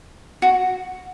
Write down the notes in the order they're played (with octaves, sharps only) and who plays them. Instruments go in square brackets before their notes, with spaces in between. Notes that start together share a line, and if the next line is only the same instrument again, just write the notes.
[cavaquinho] F#4